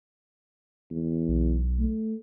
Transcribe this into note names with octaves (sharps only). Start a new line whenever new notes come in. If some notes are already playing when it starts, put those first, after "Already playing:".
E2
B1
A3